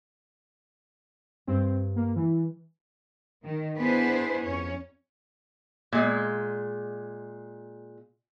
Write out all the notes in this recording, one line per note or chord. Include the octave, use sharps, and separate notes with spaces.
G2 C4
A#3
E3
D#3
B3 D4 E4 G#4 B4 C5
F2 C#4 C#5
A#2 G#3